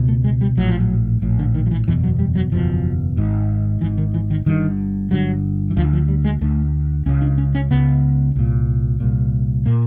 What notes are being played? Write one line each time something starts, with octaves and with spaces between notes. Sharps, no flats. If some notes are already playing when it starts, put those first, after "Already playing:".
Already playing: C#2 B2
A3
G#3
G3
A#1 A2 F#3
F3
F#3
A#1 A2
D3
D#3
F3
E3
F#1 E2 B2 E3
F#3
G3
F#3
F#1 E2 B2 F3
G#1 G#2
G#1 G#2 E3
D#3
E3
D#3
G1 G2 D3 D#3
G1 G2 D3 F#3
E3
D2 D3 F3
F3
G3
G#3
D2 D3 A3
C#2 C#3 C#4
D4
C#4
C#4
C#2 C#3 B3
C2 A#2
C2 A#2
A#2 A#3